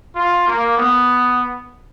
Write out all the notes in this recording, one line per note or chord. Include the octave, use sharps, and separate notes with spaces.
F4
A#3
B3